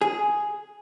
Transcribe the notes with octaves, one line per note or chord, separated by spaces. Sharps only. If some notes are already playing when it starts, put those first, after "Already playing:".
G#4